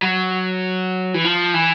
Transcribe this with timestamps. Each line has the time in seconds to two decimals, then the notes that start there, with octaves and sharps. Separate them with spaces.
0.03 F#3
1.14 E3
1.24 F3
1.54 E3